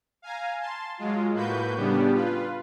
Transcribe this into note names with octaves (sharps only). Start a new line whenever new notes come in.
F5 G#5 A#5
A5 C6
F#3 G#3 F4
A2 A#3 F#4 B4 G6
A2 C#3 G3 B3 D4 G4
F4 B4